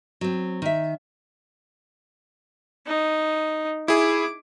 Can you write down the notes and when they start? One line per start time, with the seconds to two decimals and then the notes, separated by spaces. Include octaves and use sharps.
0.21 F#3 C4
0.62 D#3 E5
2.86 D#4
3.88 E4 G#4 D6